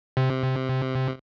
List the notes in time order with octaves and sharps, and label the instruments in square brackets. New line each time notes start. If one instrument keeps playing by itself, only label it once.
[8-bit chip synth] C3